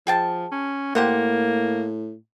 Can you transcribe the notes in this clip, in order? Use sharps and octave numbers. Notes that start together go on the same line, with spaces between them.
F3 G#4 G5 A5
C#4
A2 A#3 G4 C5 F#5